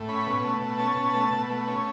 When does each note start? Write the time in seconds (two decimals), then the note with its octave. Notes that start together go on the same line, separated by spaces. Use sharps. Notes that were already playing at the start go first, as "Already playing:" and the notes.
Already playing: A2
0.08 C#4 B5
0.26 B2
0.44 A3
0.62 B2
0.79 C#4 A5
0.96 B2
1.14 A3
1.32 B2
1.49 A3
1.67 C#4